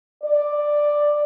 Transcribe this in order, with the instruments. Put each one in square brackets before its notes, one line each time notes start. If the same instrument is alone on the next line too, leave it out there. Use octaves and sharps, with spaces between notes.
[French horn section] D5